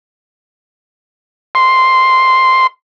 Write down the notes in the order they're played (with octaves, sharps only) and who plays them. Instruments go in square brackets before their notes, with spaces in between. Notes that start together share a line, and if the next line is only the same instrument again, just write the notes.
[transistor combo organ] C6